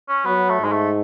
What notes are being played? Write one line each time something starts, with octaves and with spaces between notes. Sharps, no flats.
C#4
F#3 B3
A3
G#2 G#3
A3